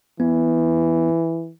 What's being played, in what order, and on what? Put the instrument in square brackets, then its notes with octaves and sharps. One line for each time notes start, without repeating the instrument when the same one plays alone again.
[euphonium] E3 [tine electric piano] B3